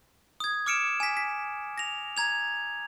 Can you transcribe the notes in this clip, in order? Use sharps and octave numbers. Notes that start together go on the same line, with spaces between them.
D#6 G#6
D6 F6 C#7 D7 E7
G#5 B6
B6
A#6 F7
A#5 G#6 F7